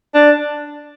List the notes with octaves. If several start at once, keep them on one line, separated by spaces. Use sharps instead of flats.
D4